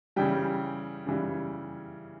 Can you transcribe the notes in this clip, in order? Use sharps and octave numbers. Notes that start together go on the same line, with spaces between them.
C#3 E3 G3 G5
C#3 E3 G3